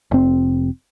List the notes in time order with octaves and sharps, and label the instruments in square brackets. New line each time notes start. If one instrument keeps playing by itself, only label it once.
[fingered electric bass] F1 C4